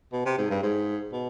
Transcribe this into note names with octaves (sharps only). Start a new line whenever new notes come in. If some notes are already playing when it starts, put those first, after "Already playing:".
B2
C3
G#2
G2
G#2
B2